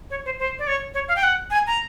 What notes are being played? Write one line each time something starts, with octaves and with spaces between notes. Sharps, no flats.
C#5
C5
C5
D5
C#5
C#5
F5
G5
F#5
G#5
A#5